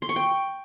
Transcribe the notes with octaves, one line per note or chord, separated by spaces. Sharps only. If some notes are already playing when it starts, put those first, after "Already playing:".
C6
C#6
G5